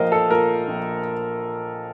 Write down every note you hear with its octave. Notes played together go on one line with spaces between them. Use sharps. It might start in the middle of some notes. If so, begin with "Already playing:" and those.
Already playing: A#1 A#2 A#4 C5 D#5 F5
A4
A#2 A#4
A#1